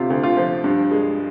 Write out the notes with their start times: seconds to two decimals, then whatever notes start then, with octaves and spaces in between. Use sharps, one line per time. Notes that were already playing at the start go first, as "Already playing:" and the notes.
Already playing: D2 C3 F4
0.10 D2
0.23 F4
0.37 F3
0.64 G2
0.91 G#3